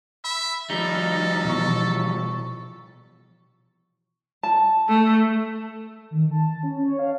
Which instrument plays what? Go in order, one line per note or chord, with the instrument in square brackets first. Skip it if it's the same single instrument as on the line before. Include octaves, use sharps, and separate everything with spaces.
[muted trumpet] E5 [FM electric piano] B5
[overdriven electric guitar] F3 G3 [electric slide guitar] D#4 [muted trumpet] A4
[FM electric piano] B2 E3 C#6
[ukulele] A5
[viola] A3
[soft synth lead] D#3
A5
C#4
C#5
F5